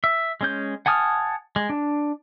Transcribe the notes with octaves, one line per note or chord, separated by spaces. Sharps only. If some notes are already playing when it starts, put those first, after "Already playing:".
E5
G#3 C#4 G6
F#5 G#5 A5 D#6 F6
G#3
D4